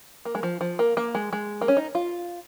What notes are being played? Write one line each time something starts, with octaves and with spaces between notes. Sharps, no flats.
A#3
G#3
F3
F3
A#3
A#3
G#3
G#3
A#3
C#4
D#4
F4